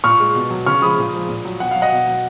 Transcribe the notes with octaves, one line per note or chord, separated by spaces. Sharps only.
A#2 C#6 F6
G#3
B2
F#3
C#3 C#6 F6
F3 G#3 B5 D#6
A#2
F3 G#3
A#2
F#3
B2 F#5
F#3 F5
D#5 F#5
B2
F#3